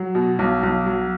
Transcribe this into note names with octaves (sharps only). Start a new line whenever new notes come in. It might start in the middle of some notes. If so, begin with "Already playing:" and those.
Already playing: F#3
B2
B1
B1
F#3